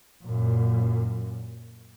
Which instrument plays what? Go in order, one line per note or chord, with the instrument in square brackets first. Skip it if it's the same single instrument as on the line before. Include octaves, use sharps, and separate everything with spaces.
[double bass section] F#2 A#2